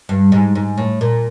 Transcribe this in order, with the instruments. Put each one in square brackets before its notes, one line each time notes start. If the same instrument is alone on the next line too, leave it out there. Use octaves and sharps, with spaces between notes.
[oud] G2
G#2
G#2
A2
A#2